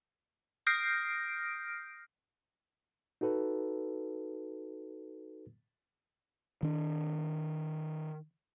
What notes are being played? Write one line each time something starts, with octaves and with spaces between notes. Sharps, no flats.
D#6 F6 G6 A#6 C7 D7
D#4 F#4 A4 B4
D#3 D4